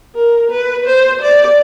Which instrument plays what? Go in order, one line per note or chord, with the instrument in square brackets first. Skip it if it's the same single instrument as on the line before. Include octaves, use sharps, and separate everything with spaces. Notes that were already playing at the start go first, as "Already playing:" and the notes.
[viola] A#4
B4
C5
D5